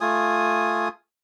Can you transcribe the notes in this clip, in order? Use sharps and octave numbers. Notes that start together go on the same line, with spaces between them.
A3 F4 G#5 D#6